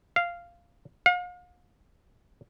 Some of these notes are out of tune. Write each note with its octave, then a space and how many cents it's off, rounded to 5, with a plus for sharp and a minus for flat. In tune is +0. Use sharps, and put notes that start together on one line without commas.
F5 -10
F5 +40